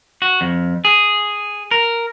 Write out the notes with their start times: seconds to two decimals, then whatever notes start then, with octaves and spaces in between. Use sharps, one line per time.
0.22 F#4
0.41 F2
0.85 G#4
1.71 A#4